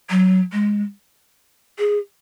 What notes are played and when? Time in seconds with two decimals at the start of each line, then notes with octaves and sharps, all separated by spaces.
0.10 F#3
0.53 G#3
1.79 G#4